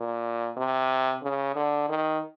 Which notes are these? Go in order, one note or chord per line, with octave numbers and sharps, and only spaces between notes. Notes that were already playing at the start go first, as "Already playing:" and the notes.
Already playing: A#2
C3
C#3
D3
D#3